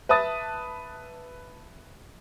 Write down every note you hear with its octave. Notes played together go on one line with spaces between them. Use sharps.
B4 E5 A5 D#6 A6